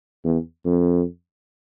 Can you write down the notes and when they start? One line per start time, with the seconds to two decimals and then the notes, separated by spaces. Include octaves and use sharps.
0.25 E2
0.65 F2